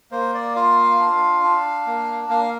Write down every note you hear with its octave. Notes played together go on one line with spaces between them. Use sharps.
A#3 C5
D5
F4 F5
D4
D4
A#3
A#3 F5